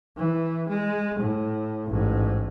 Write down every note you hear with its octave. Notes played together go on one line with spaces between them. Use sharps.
E3
G#3
A2
A1 G#2